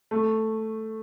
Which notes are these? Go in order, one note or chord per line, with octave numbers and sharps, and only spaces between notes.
A3